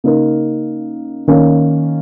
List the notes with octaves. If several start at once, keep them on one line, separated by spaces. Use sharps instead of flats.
C#3 A#3 D#4 A#4
D#3 A#3 C#4